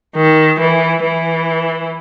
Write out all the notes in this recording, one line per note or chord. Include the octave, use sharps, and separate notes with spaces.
D#3
E3
E3